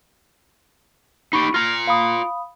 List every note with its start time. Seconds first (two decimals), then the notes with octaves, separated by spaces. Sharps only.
1.33 D#4 G4 B5 C#6
1.54 F4 A#5 F6 A#6
1.87 F5 B5 D#6